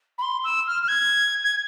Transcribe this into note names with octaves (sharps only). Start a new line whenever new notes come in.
B5
C6
E6
F6
F6
G#6
G#6